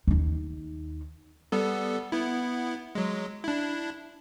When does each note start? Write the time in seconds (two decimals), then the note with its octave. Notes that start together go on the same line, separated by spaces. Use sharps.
0.07 D#2 D#4
1.52 G3 B3 A4
2.12 B3 E4
2.95 F#3 G#3
3.44 D4 E4